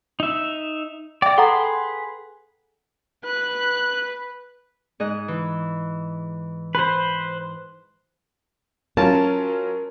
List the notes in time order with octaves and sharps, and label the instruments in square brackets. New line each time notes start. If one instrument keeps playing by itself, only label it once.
[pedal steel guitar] D#4 E5
[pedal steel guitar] D5 [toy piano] E5 G5
[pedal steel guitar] G#4 B4 C6 [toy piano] A4 F#5 A#5
[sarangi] B4 [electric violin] F#6
[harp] G#2 D#5 F#6
E3
[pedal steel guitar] B4 C5 [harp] C6
[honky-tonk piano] F#3 C#4 F4 [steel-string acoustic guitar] A#4 [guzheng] A5